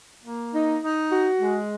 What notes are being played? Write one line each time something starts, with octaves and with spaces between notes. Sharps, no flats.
A#3
D#4
D#4
F#4
G#3